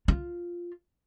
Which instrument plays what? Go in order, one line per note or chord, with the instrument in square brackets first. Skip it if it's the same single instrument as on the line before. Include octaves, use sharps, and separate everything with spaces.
[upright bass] F4